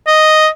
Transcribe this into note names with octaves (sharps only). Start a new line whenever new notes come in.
D#5